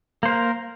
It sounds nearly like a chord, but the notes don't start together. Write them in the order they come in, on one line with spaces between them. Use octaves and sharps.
A#3 C5 A#4